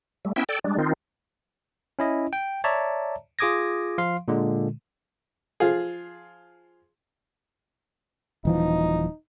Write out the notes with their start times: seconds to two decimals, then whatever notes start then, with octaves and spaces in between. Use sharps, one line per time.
0.25 G3 A3
0.36 B3 C#4 E4 E5 G5
0.49 A4 D5 G5
0.64 G3 G#3 D4
0.78 D#3 C4 D#4 F4
1.99 C#4 E4 D#5
2.33 G5
2.64 C#5 D5 E5 A5 A#5
3.39 F4 G#4 D6 D#6 G#6 A#6
3.98 F3 F5 C6
4.28 A#2 D3 G#3
5.60 F3 F4 G#4
8.45 D#1 E3 F3 D#4